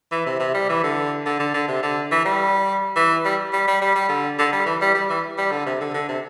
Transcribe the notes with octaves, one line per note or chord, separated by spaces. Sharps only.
E3
C3
C3
G3
E3
D3
D3
D3
D3
C3
D3
E3
G3
E3
G3
G3
G3
G3
G3
D3
D3
G3
E3
G3
G3
E3
G3
D3
C3
D3
D3
C3